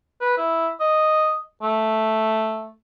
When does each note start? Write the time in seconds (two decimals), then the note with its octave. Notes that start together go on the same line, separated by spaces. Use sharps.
0.21 B4
0.38 E4
0.80 D#5
1.62 A3